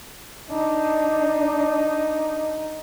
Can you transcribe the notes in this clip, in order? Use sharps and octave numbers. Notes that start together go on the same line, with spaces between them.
D4 D#4